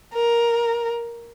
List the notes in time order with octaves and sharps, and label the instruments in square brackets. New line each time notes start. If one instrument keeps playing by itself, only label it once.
[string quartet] A#4